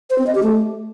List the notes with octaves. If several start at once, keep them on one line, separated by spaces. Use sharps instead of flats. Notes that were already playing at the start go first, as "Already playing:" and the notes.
C5
C4
D#5
G4
A3